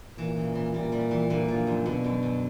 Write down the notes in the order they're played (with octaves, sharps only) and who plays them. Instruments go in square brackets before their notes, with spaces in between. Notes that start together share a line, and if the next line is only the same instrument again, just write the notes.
[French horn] A#2 [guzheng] E3
[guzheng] C#3
E3
[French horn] A#2 [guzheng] G3
[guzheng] G3
E3
[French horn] A#2 [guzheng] D3
[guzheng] F3
F#2
[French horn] B2 [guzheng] D3
[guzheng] F#2
F#2